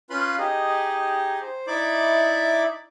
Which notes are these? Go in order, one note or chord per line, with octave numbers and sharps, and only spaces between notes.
C#4 F4 B4 F5 B5 C6
D#4 G4 G#4 D#5
C5
D#4 E4 D5 E5 B5 D6